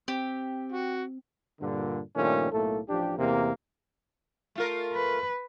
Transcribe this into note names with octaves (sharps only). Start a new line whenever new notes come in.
C4 G4
F#4
G2 A#2 D3
G2 A#2 D#3 F3 A3 C#4
B1 A2 A3 A#3 A4
A1 F3 D4 G4
E2 C3 A#3
A3 F4 A#4
B4